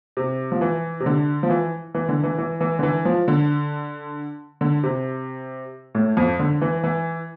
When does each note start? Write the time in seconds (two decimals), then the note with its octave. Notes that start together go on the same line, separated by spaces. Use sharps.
0.17 C3
0.52 F3
0.61 E3
1.00 C3
1.06 D3
1.43 F3
1.50 E3
1.95 E3
2.09 D3
2.23 E3
2.38 E3
2.61 E3
2.79 D3
2.83 E3
3.05 F3
3.28 D3
4.61 D3
4.83 C3
5.95 A2
6.17 F2
6.39 D3
6.61 E3
6.84 E3